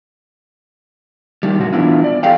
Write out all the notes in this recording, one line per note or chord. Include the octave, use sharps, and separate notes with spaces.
D#3 G3
F#2 A#2 F#4
E3 B3 D4 E4 F4
D5
G4 A4 D5 F5 G5